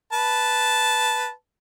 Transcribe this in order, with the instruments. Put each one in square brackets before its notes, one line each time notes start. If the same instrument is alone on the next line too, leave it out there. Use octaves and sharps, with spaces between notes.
[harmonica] B4 A5